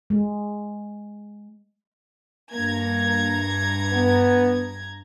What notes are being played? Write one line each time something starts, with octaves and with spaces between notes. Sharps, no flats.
G#3
G2 A#3 A#5 G#6
B3